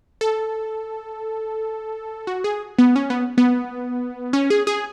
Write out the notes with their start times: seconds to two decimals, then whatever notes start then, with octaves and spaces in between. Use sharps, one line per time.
0.21 A4
2.27 F#4
2.44 G#4
2.79 B3
2.96 C#4
3.10 B3
3.38 B3
4.33 C#4
4.50 G#4
4.67 G#4